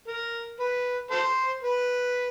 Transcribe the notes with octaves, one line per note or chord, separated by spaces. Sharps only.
A#4
B4
A4 C5
B4